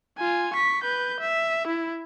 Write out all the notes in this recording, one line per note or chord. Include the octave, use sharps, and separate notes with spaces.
F4 G#5
C#6 B6
B4 G6
E5
E4